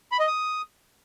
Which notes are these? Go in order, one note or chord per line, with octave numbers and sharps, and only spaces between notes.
B5
D#5
D#6